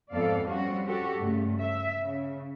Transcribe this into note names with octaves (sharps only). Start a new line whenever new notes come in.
F2 G#2 B3 A4 D5 F5
G3 C4 C#4 F#4
F#4 G4 A4
G2 C#3 A3
E5
C#3